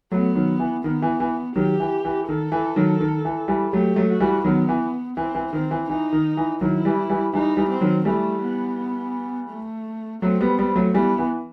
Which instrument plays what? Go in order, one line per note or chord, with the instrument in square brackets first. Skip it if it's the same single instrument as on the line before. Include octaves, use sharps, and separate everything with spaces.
[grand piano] F#3 A3 [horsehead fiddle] B3
[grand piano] D#3 F#3
E3
[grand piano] D#3 [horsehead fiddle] B3
[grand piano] E3
E3
[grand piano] D#3 F#3 [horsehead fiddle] G4
[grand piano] E3
E3
[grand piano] D#3 [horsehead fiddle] A4
[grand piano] E3
D#3 F#3
D#3
E3
E3 G3
[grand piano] F#3 A3 [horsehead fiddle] G4
[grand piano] F#3 A3
[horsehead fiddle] F#4
[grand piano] E3 G3
[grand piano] D#3 F#3 [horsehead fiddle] B3
[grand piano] E3
[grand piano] E3 [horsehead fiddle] C4
[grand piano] E3
[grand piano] D#3 [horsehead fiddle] C4
[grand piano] E3
[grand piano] E3 [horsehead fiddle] D#4
[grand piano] D#3
E3
[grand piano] D#3 F#3 [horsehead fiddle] E4
[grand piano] E3 G3
E3 G3
[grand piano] E3 G3 [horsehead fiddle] D#4
[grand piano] E3 G3
[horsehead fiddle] C4
[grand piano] D#3 F#3
[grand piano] E3 G3 [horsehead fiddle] A3
[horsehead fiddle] B3
A3
[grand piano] F#3 A3 [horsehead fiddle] C4
[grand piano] G3 B3
G3 B3
F#3 A3
[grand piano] E3 G3 [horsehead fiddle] B3
[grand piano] E3